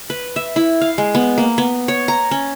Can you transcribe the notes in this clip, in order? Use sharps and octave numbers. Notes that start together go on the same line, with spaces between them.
B4
E5
E4
F5
G#3
B3
A#3
B3
C#5
A#5
C#4